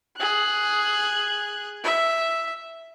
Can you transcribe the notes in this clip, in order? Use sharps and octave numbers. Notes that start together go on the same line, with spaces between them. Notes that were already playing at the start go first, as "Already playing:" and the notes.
G#4 F#6
E5